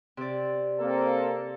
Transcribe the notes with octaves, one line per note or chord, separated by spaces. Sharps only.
C3 D5
A#3 C4 A4